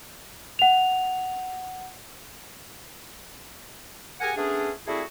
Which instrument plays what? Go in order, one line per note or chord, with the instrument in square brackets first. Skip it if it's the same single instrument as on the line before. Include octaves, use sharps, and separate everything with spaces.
[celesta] F#5 F7
[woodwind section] G4 G#4 A#4 F#5 G#5
A3 B3 C#4 D4 G#4
G3 A3 C4 E4 F#4 G#4